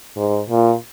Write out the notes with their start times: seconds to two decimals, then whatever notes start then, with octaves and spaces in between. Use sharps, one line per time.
0.16 G#2
0.50 A#2